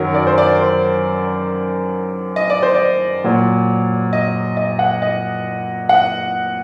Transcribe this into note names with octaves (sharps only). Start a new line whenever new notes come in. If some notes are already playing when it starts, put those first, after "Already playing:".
Already playing: F#2 D#3 F#3 A#4
D5
C5
D5
C5
D#5
D5
C5
D5
A#2 F#3
D#5
D#5
F#5
D#5
F#5